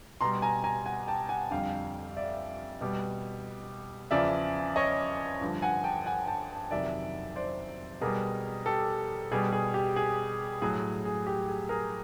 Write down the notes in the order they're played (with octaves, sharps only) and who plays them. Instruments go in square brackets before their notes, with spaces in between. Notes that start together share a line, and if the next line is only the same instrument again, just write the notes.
[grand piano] B2 A#5 C6
G3
G#5 A#5
G#5 A#5
F#5 G#5
G5 A5
F#5 G#5
F2 D3 G3 F5 G5
D5 E5
B2 G3
E2 C#3 F3 D5 E5
C#5 D#5
G2 D3 F3
F#5 G#5
G5 A5
F#5 G#5
G5 A5
F2 C3 D#3 F#3 D5 E5
C5 D5
B2 G3 G#4 A#4
G4 A4
B2 G3 G#4
G#4
G4
G#4
A2 F#3 G#4
G#4
G4
G#4
G#4 A#4